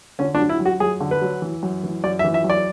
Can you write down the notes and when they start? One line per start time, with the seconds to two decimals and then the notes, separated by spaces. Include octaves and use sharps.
0.19 D3 C#4
0.35 D4
0.39 F#3
0.49 E4
0.60 F#2
0.65 F#4
0.80 F#2 G#4
1.00 D3
1.11 B4
1.22 F#3
1.42 E3
1.63 F#2
1.83 E3
2.04 F#2 D5
2.19 E5
2.24 E3
2.34 E5
2.44 F#2
2.50 D5